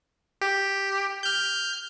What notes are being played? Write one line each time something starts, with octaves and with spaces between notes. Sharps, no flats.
G4
F6 G6